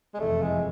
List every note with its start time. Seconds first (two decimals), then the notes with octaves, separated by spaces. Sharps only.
0.14 G#3
0.19 F#1 F2 C3 E3 A3
0.42 G#3